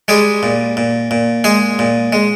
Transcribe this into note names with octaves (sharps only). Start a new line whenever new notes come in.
G3 G#3 G#4
A#2
A#2
A#2
G#3 G#4
A#2
G#3